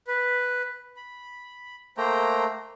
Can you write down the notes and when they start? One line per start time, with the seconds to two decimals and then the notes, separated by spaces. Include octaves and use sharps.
0.07 B4
0.97 B5
1.97 A3 A#3 C5 G5 A#5